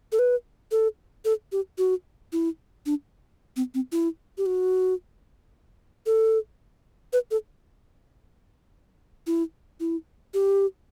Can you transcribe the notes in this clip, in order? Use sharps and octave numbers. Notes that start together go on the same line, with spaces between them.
A4
B4
A4
A4
G4
F#4
E4
D4
C4
C4
E4
G4
F#4
A4
B4
A4
E4
E4
G4